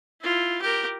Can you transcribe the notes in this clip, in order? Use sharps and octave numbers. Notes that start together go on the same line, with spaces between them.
E4 F4
G4 A#4